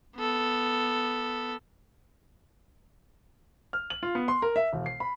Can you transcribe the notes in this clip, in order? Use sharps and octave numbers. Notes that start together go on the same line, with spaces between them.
B3 A4
F6
F#7
F4
B3
C6
A#4
E5
E1
C7
B5